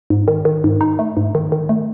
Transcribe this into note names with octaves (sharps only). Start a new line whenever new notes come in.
G#2
D#3
D#3
G#2
D#4
A3
G#2
D#3
D#3
A3